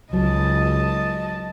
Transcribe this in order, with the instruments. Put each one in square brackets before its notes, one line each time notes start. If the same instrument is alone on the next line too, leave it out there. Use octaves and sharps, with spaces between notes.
[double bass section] C#2 [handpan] F#3 [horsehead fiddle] D#5 A5